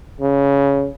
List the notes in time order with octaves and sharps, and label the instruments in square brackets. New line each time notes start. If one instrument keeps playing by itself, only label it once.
[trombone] C#3